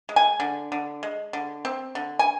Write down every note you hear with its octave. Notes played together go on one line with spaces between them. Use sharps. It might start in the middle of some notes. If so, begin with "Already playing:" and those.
G#3
G#5
D3
D3
G#3
D3
C4
D3
G#5